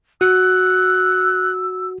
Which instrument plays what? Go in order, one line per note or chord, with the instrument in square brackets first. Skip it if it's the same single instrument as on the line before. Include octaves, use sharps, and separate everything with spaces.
[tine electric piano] F#4 [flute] E6 [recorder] F#6